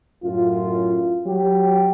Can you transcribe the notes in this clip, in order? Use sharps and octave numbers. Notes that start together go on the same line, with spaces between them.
F#2 A2 F4
F#3 G4